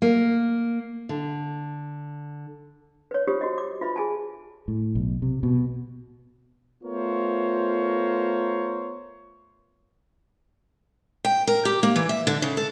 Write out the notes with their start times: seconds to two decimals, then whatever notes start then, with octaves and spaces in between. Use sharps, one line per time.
0.02 A#3
1.09 D3
3.11 B4 C#5
3.28 F4 G4 C5 C#5 D#6
3.41 F#4 D#5
3.58 D6
3.81 F4 B4 E5 B5
3.96 G#4 G#5 A5
4.68 A2
4.95 B1
5.22 C3
5.43 B2
6.83 A3 B3 F4 A#4 C5 C#5
11.25 G5
11.47 A#4
11.65 G4
11.83 A#3
11.96 E3
12.09 E5
12.27 D3
12.42 C#3
12.57 A4